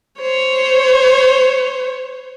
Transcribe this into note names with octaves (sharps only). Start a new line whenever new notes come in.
C5 C#5